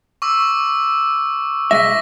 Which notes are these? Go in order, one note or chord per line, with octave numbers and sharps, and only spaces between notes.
C#6 D6 E6
B1 G#3 E5 A#6 B6